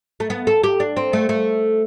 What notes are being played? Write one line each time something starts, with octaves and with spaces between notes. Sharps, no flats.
A3
B3
A4
G4
D4
C4
A3
A3